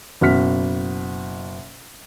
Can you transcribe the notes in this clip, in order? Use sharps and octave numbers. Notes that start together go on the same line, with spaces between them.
F#1 B2 F#4 F6 B6